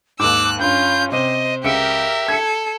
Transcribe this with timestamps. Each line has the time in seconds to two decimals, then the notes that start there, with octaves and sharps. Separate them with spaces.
0.19 D#2 G#2 D6 E6 F#6
0.59 G2 C#4 F4 G6
1.12 C3 C5 D#5
1.64 C#2 G4 A#4 E5 C#7 D7
2.28 A4 G#6 C#7